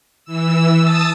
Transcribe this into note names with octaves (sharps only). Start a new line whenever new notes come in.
E3 E6
A5 D#6 E6 A6